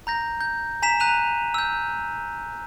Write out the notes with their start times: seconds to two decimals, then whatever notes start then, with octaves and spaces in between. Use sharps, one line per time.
0.07 A#5 G6 A#6
0.41 G6
0.82 G#5 A#5 B6 E7
1.00 A#5 F#6 D#7 F7
1.54 E6 G6